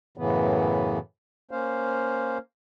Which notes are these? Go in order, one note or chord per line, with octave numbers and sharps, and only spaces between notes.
F#2 A2 C#3 E3 B3
A#3 C#4 C5 F5